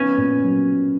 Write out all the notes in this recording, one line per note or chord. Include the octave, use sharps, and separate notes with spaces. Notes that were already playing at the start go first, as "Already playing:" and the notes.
Already playing: B3 C#4
A#2
F#3